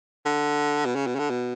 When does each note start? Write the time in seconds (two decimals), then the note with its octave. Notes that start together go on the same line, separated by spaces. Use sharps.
0.25 D3
0.85 B2
0.96 C#3
1.07 B2
1.15 C#3
1.19 D3
1.30 B2